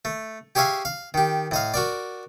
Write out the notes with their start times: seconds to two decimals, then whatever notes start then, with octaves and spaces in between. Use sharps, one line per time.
0.05 A3
0.55 G4 G#4 C#5 E5 F5 G#5
0.85 F5
1.14 D#3 G4
1.51 A2 D#5 F5
1.74 F#4 A#4 D5